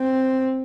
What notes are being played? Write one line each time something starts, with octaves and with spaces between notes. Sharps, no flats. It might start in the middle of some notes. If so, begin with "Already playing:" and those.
Already playing: C4